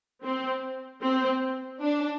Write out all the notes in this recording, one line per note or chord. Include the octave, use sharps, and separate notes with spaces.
C4
C4
D4